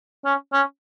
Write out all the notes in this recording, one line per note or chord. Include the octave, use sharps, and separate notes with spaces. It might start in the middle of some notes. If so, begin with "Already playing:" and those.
C#4
C#4